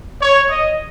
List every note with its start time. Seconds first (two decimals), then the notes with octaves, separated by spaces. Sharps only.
0.22 C#5
0.50 D#5